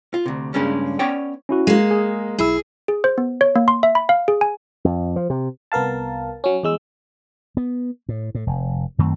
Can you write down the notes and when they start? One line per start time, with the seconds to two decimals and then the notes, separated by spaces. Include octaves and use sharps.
0.14 F4
0.26 D2 C3
0.54 G2 C#3 G#3 A#3 C#4 D4
0.99 B3 C#4 C#5 D5 G5
1.49 C#4 E4 F#4
1.67 G#3 A#3
1.91 G#4
2.38 B1 E4 G#4 E6
2.88 G#4
3.04 C5
3.18 B3
3.41 C#5
3.56 A#3
3.68 C6
3.83 E5
3.95 B5
4.09 F5
4.28 G#4
4.41 G#5
4.85 F2
5.16 F3
5.30 C3
5.72 C2 B3 A#4 F5 A5
6.44 F#3 C#4
6.63 E2 G#3 E6
7.57 B3
8.09 A2
8.35 A2
8.47 F1
8.98 F#2 D#3 A3 C4